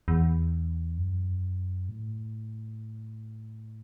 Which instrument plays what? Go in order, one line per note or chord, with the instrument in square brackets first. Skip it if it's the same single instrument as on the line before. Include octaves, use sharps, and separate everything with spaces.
[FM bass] E2
F#2
A2